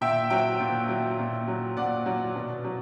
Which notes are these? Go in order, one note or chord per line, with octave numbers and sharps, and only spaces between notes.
A#2 E5 G5
F#3 E5 G5
A#2
F#3
A#2
F#3
A#2 D5 F#5
F#3
B2
F#3